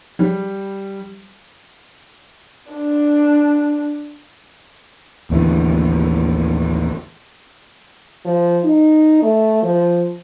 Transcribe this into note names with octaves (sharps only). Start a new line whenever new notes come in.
G3
D4
A1 D#2 D3 E3
F3
D#4
A3
F3